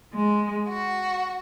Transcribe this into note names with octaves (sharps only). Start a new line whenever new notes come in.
G#3
F#4